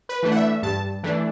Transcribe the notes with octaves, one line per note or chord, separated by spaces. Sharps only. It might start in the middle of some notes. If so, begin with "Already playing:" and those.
B4
E3 A3 D4
F#5
E5
G2 A5
E3 A3 D4